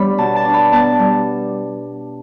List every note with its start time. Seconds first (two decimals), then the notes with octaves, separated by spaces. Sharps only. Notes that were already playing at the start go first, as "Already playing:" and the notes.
Already playing: G3 B3 D4 C#5 B5
0.18 B2 A5
0.36 A5
0.45 D4
0.54 B5
0.72 B3 A5
0.99 G3